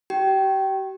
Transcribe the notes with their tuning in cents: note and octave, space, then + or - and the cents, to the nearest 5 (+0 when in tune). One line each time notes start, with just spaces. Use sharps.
G4 -40 G5 -20